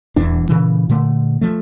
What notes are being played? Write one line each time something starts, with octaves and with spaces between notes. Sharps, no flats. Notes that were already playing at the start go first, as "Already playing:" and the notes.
D#1 E2 E3 D4
A#2 C#3 E3
A#2 D3 A3
F3 A3